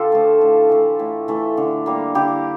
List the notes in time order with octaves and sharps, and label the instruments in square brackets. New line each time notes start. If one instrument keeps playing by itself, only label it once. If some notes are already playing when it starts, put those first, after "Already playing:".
Already playing: [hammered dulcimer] D3 F4 G4 A4
F3 A3
A2
E3 A3
A2
E3 A3
D3
G3 A#3
D3 E4 G4